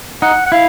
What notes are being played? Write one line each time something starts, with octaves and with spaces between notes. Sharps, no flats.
D#4 F#5
F#5
E4 F5